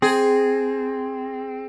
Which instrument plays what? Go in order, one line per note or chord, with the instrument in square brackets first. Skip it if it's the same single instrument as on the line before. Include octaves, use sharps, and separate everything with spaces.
[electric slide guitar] C4 [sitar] G#4